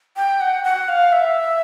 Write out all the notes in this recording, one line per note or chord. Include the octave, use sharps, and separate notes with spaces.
G5
F#5
F#5
F5
E5